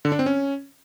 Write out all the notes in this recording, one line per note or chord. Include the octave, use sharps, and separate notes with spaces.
D3
D4
C4
C#4